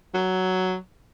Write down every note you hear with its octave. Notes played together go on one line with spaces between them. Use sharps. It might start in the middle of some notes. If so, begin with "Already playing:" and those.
F#3